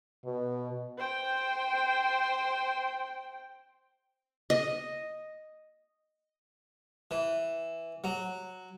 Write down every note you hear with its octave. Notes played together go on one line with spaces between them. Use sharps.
B2
C5 G5
D#5
E3
F#3